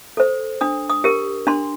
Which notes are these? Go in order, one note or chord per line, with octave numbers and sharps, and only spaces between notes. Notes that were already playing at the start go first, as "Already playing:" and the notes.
A4 C5
D4 D#6
D#6
G4 A#4
D4 C6